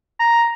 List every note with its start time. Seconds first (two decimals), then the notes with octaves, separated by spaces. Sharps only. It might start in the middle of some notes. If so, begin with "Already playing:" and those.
0.20 A#5